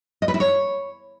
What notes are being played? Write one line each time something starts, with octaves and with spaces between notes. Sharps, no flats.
D#5
B4
E4
C#5